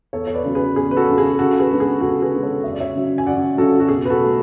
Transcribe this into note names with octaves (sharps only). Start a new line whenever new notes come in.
E2 A4 C#5
C#5
B4 D5
C#3 F#3
G#4 B4
E2 G#4
B4
F#4 A4
C#3 F#3
G#4
C#3 F#4 A4
G#4 B4
G#3 B3 D4
G#4
C#3 F#4 A4
G#4 B4
G#3 B3 D4
A4 C#5
F#2 E5
D5
C#5 E5
C#3 F#3
G#5
F#2 D5 F#5
C#3 F#3 F#4 A4
F#4
B2 G#4
B4
F#4 A4
F#3 A3